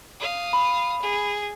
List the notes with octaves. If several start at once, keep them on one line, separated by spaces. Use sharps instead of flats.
F5 D#6
B5
G#4